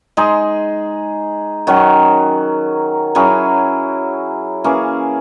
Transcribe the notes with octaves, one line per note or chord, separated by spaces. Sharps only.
G#3 D#4 G#4
D#3 F#3 C#4
F#3 C#4 E4 G#4
E3 A#3 C#4 G#4